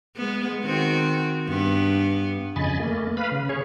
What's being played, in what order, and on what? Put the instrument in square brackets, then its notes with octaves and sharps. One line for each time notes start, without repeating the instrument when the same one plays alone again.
[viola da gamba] G#3 B3
D#3 C4 F#4
G2 B3
[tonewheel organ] F2 C#3 D#5 G#5 B5 A6
A3 A#3
B4 F5 B5
C#3
G#4 C#5